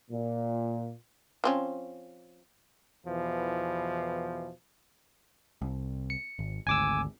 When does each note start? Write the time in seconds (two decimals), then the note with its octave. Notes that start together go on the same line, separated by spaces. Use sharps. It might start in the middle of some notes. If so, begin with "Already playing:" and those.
0.11 A#2
1.44 F3 C4 C#4
3.05 E2 B2 E3 F3
5.62 C2
6.10 C#7
6.39 G#1
6.67 G#1 D2 G#5 D6 E6